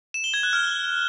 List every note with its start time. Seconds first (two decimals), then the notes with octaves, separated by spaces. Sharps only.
0.14 E7
0.24 G7
0.34 G#6
0.43 F#6
0.53 F6